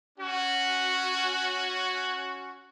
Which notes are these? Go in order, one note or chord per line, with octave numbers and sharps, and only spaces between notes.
C#4 F#4